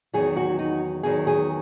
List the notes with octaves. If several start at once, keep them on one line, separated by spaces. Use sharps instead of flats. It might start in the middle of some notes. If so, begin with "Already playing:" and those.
E2 D#3 F#3 G#4
F#4
D#4
E2 D#3 F#3 G#4
G#4